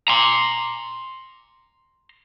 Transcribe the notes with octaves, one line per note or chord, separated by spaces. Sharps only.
A#5 C6